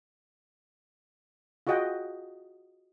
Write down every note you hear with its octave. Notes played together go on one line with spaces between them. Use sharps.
F4 F#4 G#4 D#5 F#5 G5